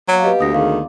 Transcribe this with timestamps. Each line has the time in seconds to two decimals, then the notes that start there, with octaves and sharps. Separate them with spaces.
0.08 F#3 A#3 B3 F#4
0.24 G4 B4 D#5
0.40 D2 F4 D5 D#6 A#6
0.54 D#3 G#4 F5